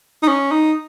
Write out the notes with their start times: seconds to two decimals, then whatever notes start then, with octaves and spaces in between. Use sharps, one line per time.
0.23 D#4
0.28 C#4
0.51 D#4